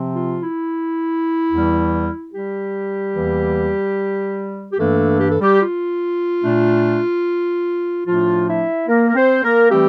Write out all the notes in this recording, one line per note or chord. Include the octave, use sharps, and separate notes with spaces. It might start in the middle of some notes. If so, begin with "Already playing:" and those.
Already playing: C3 F3 C4
F4
E4
E2 E3 G3
G3 G4
E2 E3 A#3
G4
G2 E3 A3 A#3 D4 A4
G4
A4
G3 G4
F4
A#2 A3 D4
A2 F3 A3 D4 F4
E4 E5
A#3 A#4
A#4
C4 C5
A#3 A#4
E3 G3 A3 C4 G4